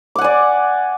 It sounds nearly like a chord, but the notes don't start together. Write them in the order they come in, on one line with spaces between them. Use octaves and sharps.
D6 F#5 G#5 D5